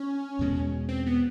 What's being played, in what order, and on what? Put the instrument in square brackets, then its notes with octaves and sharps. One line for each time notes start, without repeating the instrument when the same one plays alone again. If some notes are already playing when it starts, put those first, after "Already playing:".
Already playing: [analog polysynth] C#4
[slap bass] E2 B2 G#3
[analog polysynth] C4
B3